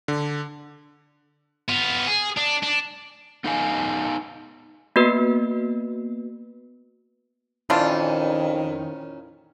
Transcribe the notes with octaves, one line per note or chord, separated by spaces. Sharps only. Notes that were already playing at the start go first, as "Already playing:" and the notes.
D3
B3 F4
G#4
D4
D4
B3 D#4 A4 F5 G#5
A#3 B3 F#4 B4
F2 A#2 D#3 E3 C#4 D4 F4